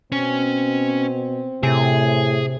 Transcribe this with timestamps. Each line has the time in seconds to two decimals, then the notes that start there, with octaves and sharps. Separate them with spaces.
0.12 B2 C4 C#4
1.63 A2 C3 G#4